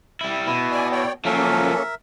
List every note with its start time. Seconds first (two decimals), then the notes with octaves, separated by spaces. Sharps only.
0.21 G3 E4
0.47 B2 E4
0.71 D5 G#5
0.92 C#5 D5 G5
1.25 F3 F#3 A#3 C#4 A4 A#4 E5